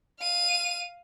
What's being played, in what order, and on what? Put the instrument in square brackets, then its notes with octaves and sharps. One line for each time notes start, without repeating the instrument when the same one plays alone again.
[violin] F5 D#7